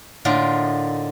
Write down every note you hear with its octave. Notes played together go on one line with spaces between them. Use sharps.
A2 D3 A#3 D#4 F4